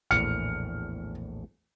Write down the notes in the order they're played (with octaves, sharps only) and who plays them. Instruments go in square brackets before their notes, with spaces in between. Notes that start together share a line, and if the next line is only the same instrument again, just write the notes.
[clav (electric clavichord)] A#1 E2 A2 [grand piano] F6 C#7